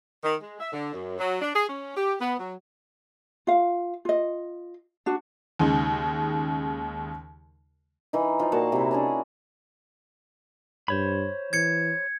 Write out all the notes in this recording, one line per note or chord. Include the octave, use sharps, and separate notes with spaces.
D#3
G#3
E5
D3
F#2
F#3
D4
G#4
C#4
G4
B3
F#3
F4 F5
F4 D#5
D4 F#4
D#2 C#3 G#3 D#4
E3 D#4
F3 D#4
A#2 A#3 F#4 A5
C3 E4
C#4 D4 G#4
G2 C5 C#5 B5
E3 G#6 C#7